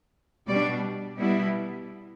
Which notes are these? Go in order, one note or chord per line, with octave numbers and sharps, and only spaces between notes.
B2 G3 D4 D5
B2 G3 B3 E4